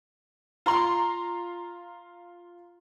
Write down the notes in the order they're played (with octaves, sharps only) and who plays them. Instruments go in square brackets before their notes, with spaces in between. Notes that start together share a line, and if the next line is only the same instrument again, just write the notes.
[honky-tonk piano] F4 A#5 C6